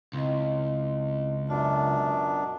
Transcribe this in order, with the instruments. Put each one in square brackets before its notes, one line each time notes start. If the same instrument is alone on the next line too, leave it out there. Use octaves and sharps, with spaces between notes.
[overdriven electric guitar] C#2 [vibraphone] C4 E4 D#5
[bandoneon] F#2 B2 D4 [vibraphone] F4 E5